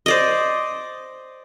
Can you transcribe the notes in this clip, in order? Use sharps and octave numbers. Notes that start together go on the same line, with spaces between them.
C5 D5 D#5